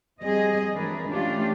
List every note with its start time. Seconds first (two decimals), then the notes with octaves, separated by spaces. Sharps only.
0.20 F3 G3 C4 G#4 D#5
0.73 E3 F#3 G#3 D4 A#4 B4
1.06 E3 A3 C#4 D4 F4 G4